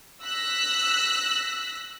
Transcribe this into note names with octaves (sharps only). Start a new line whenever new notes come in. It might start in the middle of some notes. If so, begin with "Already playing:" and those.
E6 F#6 A#6 B6